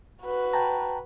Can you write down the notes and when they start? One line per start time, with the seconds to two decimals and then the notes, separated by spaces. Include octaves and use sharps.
0.23 F#4 B4
0.53 G5 A5 A#5